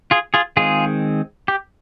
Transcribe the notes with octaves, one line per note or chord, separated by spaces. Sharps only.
F4 G#4
F4 G#4
D#3 G#3 C4 F4 G#4
G4